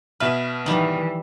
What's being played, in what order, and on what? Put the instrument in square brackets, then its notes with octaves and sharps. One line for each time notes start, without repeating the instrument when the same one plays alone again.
[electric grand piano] B2 E5 F6 [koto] B4
[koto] D#3 G3 [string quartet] E3